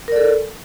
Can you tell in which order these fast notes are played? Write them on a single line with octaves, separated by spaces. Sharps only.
A#4 D5 A4